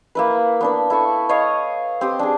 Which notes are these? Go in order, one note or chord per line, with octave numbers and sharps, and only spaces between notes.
A#3 E4 B4
B3 D4 B4
E4 A4 C#6
C#5 D#5 F5
C4 G4 D#6
D4 G#4